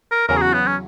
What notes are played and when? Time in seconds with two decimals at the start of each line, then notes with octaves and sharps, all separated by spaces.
0.11 A#4
0.28 E2 C#3 F#3 C#4 A#4
0.37 G#4
0.42 F#4
0.53 B3
0.67 C#4